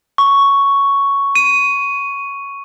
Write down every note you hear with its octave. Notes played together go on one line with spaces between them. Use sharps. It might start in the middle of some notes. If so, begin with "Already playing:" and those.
C#6
D#7